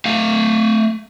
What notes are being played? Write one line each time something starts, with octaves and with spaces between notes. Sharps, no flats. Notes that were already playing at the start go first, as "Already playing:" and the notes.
A3 F5